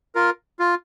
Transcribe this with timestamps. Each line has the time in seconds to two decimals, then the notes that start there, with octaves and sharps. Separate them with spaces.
0.15 F4 A#4
0.59 F4